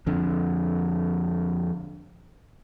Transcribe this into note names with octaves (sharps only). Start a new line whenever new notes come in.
F2 D3